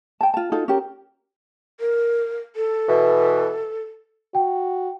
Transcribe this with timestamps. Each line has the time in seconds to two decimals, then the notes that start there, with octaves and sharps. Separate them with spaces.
0.21 G5 A5
0.34 F4 A5
0.52 D#4 F4 F#4 A4
0.68 C#4 F#4 G4 A#4
1.80 A#4
2.56 A4
2.89 B2 E3
4.35 F#4 G5